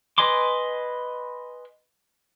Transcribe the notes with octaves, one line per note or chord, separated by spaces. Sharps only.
B4 D#5 G#5 C6 D6